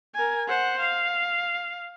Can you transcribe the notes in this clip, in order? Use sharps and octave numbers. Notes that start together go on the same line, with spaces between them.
A#4 G#5
C5 F#5
F5